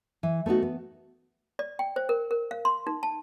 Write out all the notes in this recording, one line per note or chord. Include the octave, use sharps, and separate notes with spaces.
E3
A3 B3 D#4 F#4
B3
D5
G5
C5
A#4
A#4
F5
C6
D#4
A5